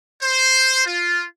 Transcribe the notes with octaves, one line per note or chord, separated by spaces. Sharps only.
C5
F4